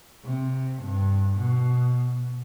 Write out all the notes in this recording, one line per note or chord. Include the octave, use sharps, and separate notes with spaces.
C3
G2
B2